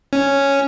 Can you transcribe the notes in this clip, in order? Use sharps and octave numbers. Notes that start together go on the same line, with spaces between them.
C#4